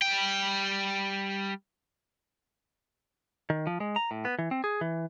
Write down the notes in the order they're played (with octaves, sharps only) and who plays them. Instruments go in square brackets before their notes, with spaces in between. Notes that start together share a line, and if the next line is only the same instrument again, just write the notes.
[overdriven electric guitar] G3 G5
[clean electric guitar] D#3
F3
G#3
A#5
A2
B3
E3
C4
G#4
E3